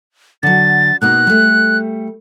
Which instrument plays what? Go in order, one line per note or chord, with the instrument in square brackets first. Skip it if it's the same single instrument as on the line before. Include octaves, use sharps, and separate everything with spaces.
[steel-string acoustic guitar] D3 F#3 [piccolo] A6
[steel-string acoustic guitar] B2 A#3 D#4 [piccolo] F#6
[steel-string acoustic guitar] G3 A3